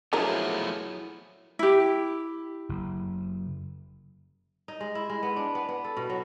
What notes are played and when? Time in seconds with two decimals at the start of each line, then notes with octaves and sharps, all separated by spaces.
0.13 F3 F#3 A3 B3 D4 E4 G#4 A#4
1.59 E4 G4
2.69 F#1
4.68 D#4
4.80 G#3
4.95 E4
5.10 G#3
5.23 B3
5.36 D4
5.55 B3
5.69 B3
5.84 A4
5.97 B2
6.10 F#3